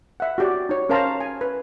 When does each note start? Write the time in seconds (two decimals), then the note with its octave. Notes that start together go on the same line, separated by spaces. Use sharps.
0.20 E5 F#5
0.38 F#4 G4 D5
0.69 D#4 C#5
0.89 C#4 A#4 C5 F5 A5 A#5
1.20 G#5
1.41 B4